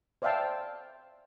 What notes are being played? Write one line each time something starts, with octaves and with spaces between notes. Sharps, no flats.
C5 D5 E5 F5 G5 A5